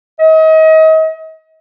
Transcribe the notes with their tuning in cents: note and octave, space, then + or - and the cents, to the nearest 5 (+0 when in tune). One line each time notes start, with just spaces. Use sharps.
D#5 +35